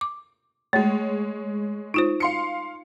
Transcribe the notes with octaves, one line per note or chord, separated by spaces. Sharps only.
D6
G#3 A3 C#5
D#4 F4 C5
F5 C6 C#7